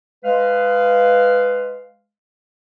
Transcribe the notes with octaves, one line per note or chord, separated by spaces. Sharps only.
G#3 B4 F5